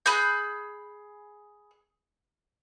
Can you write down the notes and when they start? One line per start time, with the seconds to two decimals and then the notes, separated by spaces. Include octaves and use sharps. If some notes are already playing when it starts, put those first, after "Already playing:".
0.06 G#4 B5 F#6 G6